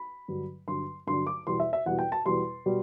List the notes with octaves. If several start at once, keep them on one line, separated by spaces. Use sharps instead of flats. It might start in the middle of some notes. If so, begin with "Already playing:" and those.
Already playing: B5
G2 D3 F#3
G2 D3 F#3 C6
G2 D3 F#3 C6
D6
E2 B2 G3 C6
E5
E5
E2 B2 G3 F#5
G5
A5
E2 B2 G3 C6
B2 G3